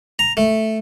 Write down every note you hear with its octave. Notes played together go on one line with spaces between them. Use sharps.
A#5
A3